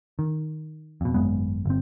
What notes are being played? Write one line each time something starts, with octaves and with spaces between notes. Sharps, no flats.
D#3
F2 B2
G#1 F#2 G#3 B3
G1 C4